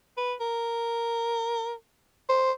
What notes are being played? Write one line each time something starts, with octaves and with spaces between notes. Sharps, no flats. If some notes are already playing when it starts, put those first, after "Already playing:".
B4
A#4
C5